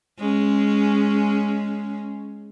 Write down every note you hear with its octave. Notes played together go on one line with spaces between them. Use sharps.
G#3 C#4